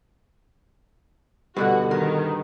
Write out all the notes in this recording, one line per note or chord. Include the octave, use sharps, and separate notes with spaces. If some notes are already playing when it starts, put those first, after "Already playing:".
G2 B2 D3 F#4
D#3 A#4